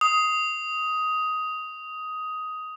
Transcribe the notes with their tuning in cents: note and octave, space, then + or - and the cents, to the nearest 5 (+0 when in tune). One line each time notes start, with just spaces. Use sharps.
D#6 +10